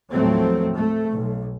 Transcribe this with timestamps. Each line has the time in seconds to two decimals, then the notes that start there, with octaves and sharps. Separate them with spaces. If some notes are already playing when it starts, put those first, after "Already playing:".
0.11 D#2 A2 F3 F#3 A3 C4
0.75 A3
1.10 B1